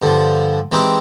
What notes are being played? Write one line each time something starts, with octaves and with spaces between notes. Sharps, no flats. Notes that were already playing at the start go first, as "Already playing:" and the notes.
G2 D3 F3
E3 G#3 C4 D#4 G4